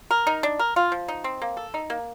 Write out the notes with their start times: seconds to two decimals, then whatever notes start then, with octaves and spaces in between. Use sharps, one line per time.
0.11 A#4
0.27 D#4
0.43 D4
0.59 A#4
0.76 F4
0.92 F3
1.08 D#4
1.24 C4
1.42 A#3
1.57 A4
1.74 D#4
1.90 A#3